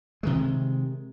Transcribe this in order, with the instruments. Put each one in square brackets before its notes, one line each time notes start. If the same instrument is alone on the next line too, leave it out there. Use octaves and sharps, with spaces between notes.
[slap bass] C3 D#3 G#3